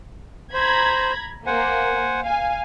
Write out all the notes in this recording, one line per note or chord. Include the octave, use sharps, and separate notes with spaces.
C5 A#5 B5 G#6
A#3 C5 F#5 G#5
F5 G#5